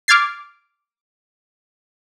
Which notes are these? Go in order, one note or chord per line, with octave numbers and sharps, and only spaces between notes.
D6 F6 G#6 A6 C7